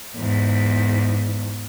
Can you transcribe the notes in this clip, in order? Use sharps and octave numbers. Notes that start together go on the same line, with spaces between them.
E2 G#2